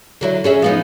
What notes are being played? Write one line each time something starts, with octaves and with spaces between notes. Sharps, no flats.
D3 F#3 E4
C#4 G#4 E5
F3 B3 D#4